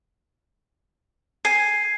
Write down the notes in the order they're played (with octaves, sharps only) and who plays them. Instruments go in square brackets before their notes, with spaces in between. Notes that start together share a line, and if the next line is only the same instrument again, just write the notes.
[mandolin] G#5 [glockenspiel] C7